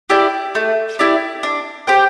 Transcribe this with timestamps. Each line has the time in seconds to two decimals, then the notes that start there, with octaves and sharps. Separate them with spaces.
0.10 E4 G4 D5
0.55 A3
0.99 E4 G4 D5
1.43 D4
1.87 G4 C5 G5